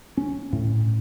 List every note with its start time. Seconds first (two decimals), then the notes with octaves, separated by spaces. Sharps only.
0.17 C#4
0.53 A2